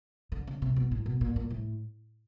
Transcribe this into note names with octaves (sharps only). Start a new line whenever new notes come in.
D3
C#3
C3
B2
A2
B2
A#2
A#2
A2